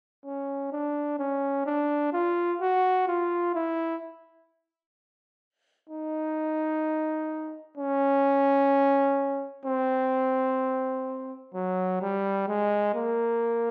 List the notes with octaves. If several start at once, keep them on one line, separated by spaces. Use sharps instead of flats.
C#4
D4
C#4
D4
F4
F#4
F4
E4
D#4
C#4
C4
F#3
G3
G#3
A#3